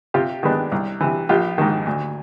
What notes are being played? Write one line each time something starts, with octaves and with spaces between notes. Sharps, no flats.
C3 F4 G4
D#3 G#3 B3 D4
C2
C3 E3
A#1 F4 G4
G#2 D#3
D2